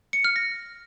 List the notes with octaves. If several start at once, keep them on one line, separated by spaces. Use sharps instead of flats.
C#7
F6
A#6